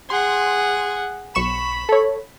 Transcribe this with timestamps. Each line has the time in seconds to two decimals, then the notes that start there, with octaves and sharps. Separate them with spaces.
0.10 G#4 F#5 C6
1.35 B1 B5 C#6 E7
1.89 A4 C#5